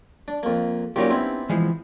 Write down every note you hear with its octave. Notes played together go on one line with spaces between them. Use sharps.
D4
F2 A#3
A#2 F#3 C#4 D#4 G4 D6
B3 C4 E4
E3 F3 G#3